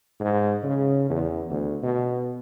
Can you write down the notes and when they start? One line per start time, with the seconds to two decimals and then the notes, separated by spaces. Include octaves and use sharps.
0.20 G#2
0.63 C#3
1.10 E2
1.51 D2
1.83 B2